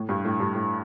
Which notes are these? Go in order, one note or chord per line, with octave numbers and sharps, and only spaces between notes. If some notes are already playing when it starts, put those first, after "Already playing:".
Already playing: A2
G2
A2
G2
A2